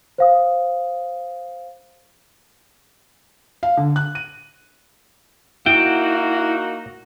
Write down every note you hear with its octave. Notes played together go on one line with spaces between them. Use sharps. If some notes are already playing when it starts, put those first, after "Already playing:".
C5 F5 D#6
F5
D3
F#6
D#7
A#3 D#4 E4 F#4 G5